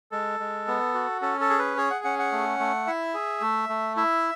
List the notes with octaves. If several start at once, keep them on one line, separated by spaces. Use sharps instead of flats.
G#3 A4
G#3
B3
F#4
C#4 A4
A4
G#4
B4
G#4 C#5
F#5
C#4 F#5
F#5
A3
A3
E4 E5
G#4
A3
A3
E4 E5